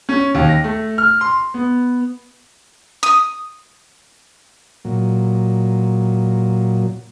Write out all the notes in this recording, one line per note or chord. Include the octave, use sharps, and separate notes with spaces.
C#4
D#2
A#6
A3
F6
C6
B3
D#6
A#2 F#3